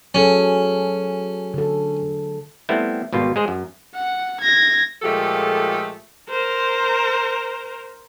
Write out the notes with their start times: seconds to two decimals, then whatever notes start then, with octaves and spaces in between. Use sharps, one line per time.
0.15 F#3 C#4 G#4 A4
1.54 D3 A4
2.69 G3 A3 B3 C4 E4
3.12 G#1 B2 G3 F4
3.36 G#3 G#4 C5
3.48 F#2
3.95 F#5
4.41 G#6 A#6
5.02 A#2 F3 G#3 A3 G4 A4
6.30 A#4 C5